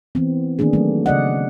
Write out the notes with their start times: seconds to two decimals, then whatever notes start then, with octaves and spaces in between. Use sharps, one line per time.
0.15 E3 B3 C4
0.59 D#3 A#3 B3 D4 G#4
0.73 F#3 A3
1.06 C#3 D5 D#5 F#5